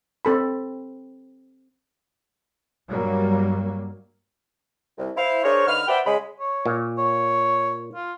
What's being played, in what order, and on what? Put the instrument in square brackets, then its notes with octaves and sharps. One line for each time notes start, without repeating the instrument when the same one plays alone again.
[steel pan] C4 A4 B5
[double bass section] G2 F#3 G3 A#3
[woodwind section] C2
E4 C5 F5
D4 G#4 A#4 C5 C#5
D3 D#4 B4 F6
B4 C5 D5 E5 F#5 G5
C#3 G#3 B5
[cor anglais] C#5
[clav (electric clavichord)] A#2
[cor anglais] C#5
F4